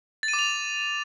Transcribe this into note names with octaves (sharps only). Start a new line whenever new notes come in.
A6
D#7
D6
F7